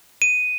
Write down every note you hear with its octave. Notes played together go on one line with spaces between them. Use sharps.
D#7